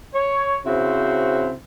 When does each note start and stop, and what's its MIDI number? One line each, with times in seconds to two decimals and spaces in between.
0.14 0.57 73
0.66 1.53 49
0.66 1.53 60
0.66 1.53 64
0.66 1.53 66
0.66 1.53 72